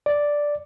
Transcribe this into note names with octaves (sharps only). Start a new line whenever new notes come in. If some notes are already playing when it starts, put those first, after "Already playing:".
D5